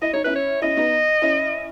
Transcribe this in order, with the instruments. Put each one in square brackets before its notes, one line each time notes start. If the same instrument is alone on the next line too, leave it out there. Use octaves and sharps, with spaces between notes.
[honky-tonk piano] E4 [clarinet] D#5
[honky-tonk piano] D#4 [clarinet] C#5
[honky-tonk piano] C#4 E4 [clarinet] B4
[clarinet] C#5
[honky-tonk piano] C#4 E4 [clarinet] D#5
[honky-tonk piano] B3 D#4
C#4 E4